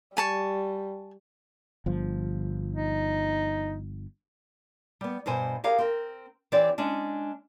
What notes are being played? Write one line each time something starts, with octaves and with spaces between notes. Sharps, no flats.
G3 G#5 A5 C#6
G1 F3
D#4
G3 B3
G2 B2 C5 G#5
G4 G#4 A#4 F5
C4 A#4
E3 C4 G4 C#5 D5
G#3 C#4 D4